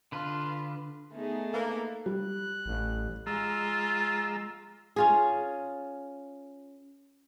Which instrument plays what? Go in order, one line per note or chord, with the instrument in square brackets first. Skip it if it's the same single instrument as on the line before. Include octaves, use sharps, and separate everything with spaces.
[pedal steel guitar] D3 B4 [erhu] F4
[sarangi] A3 [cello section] B3 D#4 G#4
[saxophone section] A#3 [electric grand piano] A4 B4
[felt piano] G3 [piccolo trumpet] F#6
[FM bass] A1
[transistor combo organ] G#3 A#5 E6 [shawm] F4
[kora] C#4 F4 G#4